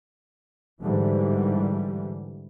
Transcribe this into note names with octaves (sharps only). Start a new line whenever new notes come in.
G#2 D3 E3 G3